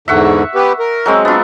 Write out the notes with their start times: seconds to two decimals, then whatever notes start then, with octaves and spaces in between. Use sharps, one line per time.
0.08 E2 G#2 D3 E5 F#5 C#6
0.55 B3 G4 B4
0.79 A#4
1.06 F#3 G#3 C4
1.25 B3 D4 F4